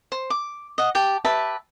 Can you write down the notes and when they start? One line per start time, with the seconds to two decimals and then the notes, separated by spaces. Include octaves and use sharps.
0.12 C5
0.30 D6
0.78 D#5 F#5
0.95 G4 G5 A5
1.25 G4 B4 E5 A5